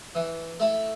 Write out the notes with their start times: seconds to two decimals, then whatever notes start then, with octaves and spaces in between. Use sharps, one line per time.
0.15 E3
0.60 A3 E4